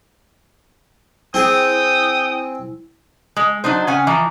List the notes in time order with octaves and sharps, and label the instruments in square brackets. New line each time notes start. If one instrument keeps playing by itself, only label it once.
[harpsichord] C4 G#4 [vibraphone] E4 [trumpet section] G5 D#6
[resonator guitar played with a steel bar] G#3
F#3 D4 D#4 C5
C#3 C#4 F#5 G#5
E3 F3 A#5